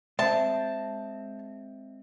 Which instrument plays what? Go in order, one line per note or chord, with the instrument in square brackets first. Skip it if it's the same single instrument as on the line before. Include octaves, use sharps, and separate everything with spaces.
[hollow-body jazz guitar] G#3 C4 [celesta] E5 [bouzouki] A5